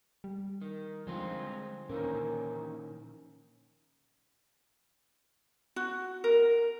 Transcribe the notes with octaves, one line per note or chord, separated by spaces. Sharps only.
G3
D#3
D3 F3 G#3 C4 F4
A#2 D#3 E3 A#3 C#4 A#4
F#4
A#4